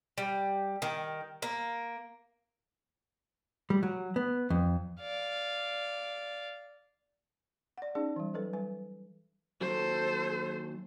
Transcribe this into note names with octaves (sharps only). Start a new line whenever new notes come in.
G3
D#3
A#3
G3
F#3
B3
F2
D5 F5
D5 F#5
C#4 D#4 G#4 D5
E3 G3
F#3 A4 B4
G3 B4 G#5
D#2 F#3 A4 C5